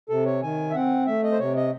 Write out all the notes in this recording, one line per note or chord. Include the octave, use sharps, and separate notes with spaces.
C3 A4
C#5
D#3 G#5
E5
C4 F#5
A3 E5
D#5
C5
C3 C#5
D#5